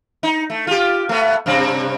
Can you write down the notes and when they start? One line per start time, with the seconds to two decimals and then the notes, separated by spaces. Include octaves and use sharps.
0.23 D#4
0.50 A3
0.67 F4 G4
1.09 A3 B3
1.46 G2 C3 C4